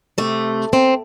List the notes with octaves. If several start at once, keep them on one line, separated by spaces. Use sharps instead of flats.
C3 A3
C4